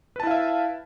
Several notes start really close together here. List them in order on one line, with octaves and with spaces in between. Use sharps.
B4 A5 E4 F5 E5